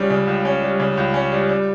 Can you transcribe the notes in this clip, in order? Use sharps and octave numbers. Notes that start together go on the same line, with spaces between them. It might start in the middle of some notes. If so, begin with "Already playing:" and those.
Already playing: C#2 C#3 G3 C#4
C#3
C#2
C#4
G3
C#3
C#2
C#4
G3
G3